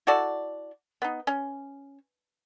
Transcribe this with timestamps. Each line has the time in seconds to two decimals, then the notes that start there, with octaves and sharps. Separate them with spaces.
0.07 E4 F#4 A4 D5
1.02 B3 D#4
1.27 C#4